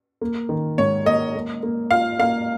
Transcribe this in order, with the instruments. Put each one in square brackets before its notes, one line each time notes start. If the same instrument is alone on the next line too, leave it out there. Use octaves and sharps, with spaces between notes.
[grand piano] A#3
D#3
[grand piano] G#2 [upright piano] C#5
[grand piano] A#3 [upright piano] D#5
[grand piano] A#3
A#3
[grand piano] F4 [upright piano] F5
[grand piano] A#3 [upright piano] F5